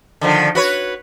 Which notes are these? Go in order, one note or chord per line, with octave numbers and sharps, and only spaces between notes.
D3 D#3 F3
F#4 B4 C#5